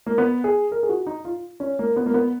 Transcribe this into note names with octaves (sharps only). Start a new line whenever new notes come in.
A#3
B3
G#4
A#4
G#4
F#4
D#4
F4
C#4
A#3
B3
A#3
B3